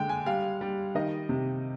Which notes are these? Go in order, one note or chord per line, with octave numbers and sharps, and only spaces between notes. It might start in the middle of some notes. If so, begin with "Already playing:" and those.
Already playing: D3 G#3 G5
G#5
G3 F5
G3
D#3 D#5
C3